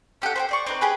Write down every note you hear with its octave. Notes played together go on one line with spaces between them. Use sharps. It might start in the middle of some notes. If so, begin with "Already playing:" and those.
C#4 G4 A4 F#5
C5 C#5 G5
C5 D5 C#6
C4 D#4 B4
G4 G#4 B4